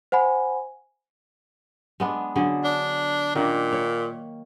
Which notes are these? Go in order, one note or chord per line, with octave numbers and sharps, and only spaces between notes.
C5 F#5 G#5 B5
G#3 B3 D4
D3 F#3 G#4
D4
A#2 D#3 A#3 D4
C#5